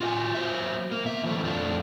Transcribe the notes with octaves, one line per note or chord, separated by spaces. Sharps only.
F4 F#4 D#5 G#5
F#3 C5 E5
A#3
B2 E5
E3 F3 A3
F2 F3 A3 D4